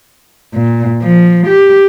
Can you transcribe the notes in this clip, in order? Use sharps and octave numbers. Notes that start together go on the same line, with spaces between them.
A#2
F3
G4